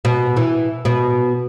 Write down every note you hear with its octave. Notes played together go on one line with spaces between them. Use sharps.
B2
E3
B2